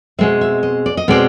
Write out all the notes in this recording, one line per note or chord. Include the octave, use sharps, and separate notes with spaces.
B2 G#3 C4 E5
E5
D#5
D5
D#5
B2 G#3 C4 D5